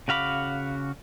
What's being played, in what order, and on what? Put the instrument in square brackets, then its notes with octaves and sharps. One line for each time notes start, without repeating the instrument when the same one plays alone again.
[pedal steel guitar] C#3 F#4 F5 B5 D6